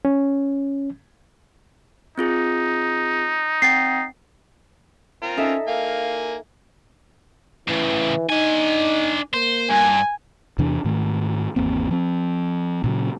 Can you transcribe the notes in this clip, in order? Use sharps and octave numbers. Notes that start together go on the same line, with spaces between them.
C#4
C4 D#4 F4 G#4
C4 F#5 G5 A6 C7
C4 F4 A#4
C#4 D#4 A4 E5
A#3 F5 G#5
A2 C#3 E3
D4 D#4 G#5
A#3 C5
G2 G#5
E2 C3 E3 D4
G#2 D#3 A3
G#1 E2 A#3 C4
F3 C4
A#2 C#3 F#3